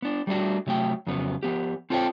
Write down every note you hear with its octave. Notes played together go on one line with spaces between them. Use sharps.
B3 D4
G3 A3 D4 F#4
C3 F#3 A3 G5
F2 C#3 F#3 B3
F3 B3 G4
C4 F4 A4 C5 C#5 G5